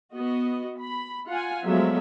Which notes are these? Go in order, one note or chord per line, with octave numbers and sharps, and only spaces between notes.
B3 F#4 D#5
B5
F4 F#5 G#5
F3 F#3 G#3 A3 B3 E5